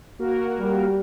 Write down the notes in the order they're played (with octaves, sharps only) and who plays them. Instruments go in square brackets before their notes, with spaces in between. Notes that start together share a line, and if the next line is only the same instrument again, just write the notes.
[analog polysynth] A#3 F#4 A#4
[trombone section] G3